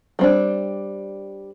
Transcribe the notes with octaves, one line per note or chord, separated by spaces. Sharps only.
G3 C4 D4